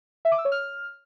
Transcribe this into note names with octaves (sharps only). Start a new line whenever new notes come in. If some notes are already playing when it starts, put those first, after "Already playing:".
E5
D6
E6
C#5
F6